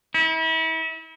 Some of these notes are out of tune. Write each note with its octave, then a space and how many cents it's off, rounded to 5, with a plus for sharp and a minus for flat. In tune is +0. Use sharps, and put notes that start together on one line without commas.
E4 -35